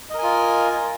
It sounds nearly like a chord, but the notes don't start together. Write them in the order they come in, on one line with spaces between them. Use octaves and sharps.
D#5 A#4 G#5 F4